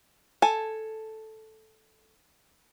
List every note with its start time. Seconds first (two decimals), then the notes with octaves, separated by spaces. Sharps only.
0.42 A4 G#5